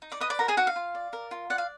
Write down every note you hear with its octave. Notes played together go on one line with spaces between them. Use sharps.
D#4
D5 D6
B4 D#5 D#6
D5 D6
F#4 A#4 A#5
G#4 G#5
D#4 F#4 F#5
F5
F4
D5
A#4
F4
D5 F#5
F5